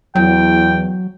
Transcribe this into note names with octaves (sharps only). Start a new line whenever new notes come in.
E2 F#3 G5